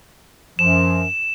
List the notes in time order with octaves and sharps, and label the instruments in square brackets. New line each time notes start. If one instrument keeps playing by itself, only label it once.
[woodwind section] F#2 F3 [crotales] E7